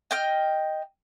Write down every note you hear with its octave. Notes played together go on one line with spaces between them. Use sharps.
D#5 G5 F6